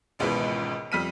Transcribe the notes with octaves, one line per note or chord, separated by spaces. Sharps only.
G#1 C#2 G#2 B2 E3
F2 G3 F6 B6 D#7